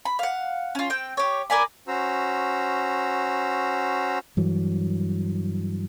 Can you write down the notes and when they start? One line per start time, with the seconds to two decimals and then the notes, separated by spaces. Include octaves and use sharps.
0.05 B5
0.19 F5 F#5
0.75 C#4 F4
0.90 C4 G5
1.17 G4 C#5
1.50 A#4 D5 G#5 B5
1.88 C#4 F#4 C5 A#5 E6
4.37 G2 E3 F#3